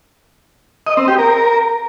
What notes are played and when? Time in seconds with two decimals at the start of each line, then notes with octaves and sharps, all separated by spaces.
0.87 D#5
0.97 C4
1.08 G4
1.18 A#4